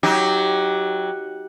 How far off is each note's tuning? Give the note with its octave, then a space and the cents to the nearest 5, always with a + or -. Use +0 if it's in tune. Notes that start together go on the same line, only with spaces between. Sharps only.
F#3 +0 D#4 +30 G4 +0